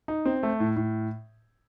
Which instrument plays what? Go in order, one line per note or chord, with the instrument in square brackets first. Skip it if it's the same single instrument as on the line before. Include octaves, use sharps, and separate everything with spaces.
[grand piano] D#4
C4
A3
A2
A2